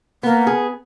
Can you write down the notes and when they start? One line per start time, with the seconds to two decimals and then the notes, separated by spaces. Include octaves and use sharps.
0.23 A#3 B3
0.47 G#4